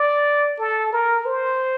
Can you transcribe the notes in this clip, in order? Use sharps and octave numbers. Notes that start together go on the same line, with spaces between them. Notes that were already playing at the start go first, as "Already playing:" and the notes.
Already playing: D5
A4
A#4
C5